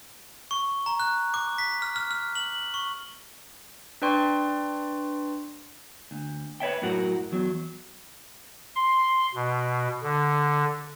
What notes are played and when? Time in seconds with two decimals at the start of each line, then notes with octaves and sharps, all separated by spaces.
0.51 C#6
0.86 A#5
1.00 F#6
1.34 D6
1.58 B6
1.82 F6
1.96 F6
2.11 F6
2.35 F#7
2.74 C#6
4.02 D4 B4 D5 G5 C6 C#6
6.11 D2
6.60 B4 C#5 E5 G5
6.82 F#2 A2 F#4 A#4 F#5
7.32 E2 F#3
8.76 C6
9.35 B2
10.03 D3